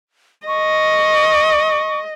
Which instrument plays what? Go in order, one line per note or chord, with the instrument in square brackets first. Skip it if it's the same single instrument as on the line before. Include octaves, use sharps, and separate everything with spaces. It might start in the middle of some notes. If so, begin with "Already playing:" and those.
[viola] D#5 [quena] C#6